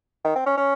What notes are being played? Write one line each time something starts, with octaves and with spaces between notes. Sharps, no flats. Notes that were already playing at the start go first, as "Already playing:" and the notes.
D#3
C4
C#4
C#4